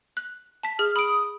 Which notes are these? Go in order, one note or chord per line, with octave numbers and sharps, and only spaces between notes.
F#6
A5 B6
G#4 F6
B5 D#6 D7